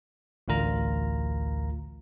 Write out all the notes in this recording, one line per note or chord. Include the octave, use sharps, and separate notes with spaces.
A1 D2 F4 A#4 A#5